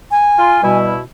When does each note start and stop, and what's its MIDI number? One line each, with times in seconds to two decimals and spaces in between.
0.11 0.78 80
0.38 0.61 65
0.63 0.98 47
0.63 0.98 55
0.63 0.98 64